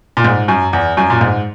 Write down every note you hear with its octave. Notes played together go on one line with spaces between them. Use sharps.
A#2
G#2
F#2
E2
F#2
A#2
G#2